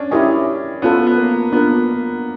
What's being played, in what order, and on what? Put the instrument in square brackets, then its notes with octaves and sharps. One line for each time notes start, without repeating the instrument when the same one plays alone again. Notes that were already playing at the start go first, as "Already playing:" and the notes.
Already playing: [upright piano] C#4 D4
[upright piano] C#4 [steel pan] E4 G4 A#4 D#5 G#5
[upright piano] B3 [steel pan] C#4 F4 A4
[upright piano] B3
A#3
[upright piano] B3 [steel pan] D4 F4 A#4